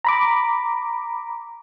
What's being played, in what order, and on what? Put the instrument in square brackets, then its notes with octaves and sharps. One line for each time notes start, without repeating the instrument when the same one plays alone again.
[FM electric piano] A#5 B5 D6